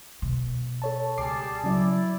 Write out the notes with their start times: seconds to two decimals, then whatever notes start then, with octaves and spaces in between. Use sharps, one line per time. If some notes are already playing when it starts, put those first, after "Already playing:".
0.22 B2
0.82 A4 C#5 A5
1.18 C#2 G3 G#4 A5 D6 C7
1.64 C#3 F#3 E4 D5